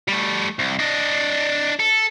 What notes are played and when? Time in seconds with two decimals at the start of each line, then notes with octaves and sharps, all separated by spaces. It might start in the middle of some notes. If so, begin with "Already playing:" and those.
0.08 G3 A3
0.59 C2
0.79 D4 D#5
1.80 A4